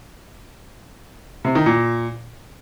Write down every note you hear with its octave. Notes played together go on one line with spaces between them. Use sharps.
C3
D#3
A#2